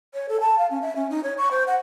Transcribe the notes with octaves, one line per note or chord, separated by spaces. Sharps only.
C#5
A4
A5
F5
C#4
E5
C#4
D#4
C#5
C#6
C5
F#5